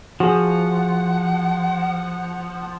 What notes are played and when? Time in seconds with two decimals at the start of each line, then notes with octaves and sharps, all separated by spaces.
0.20 F3 F#4 G#4 F#5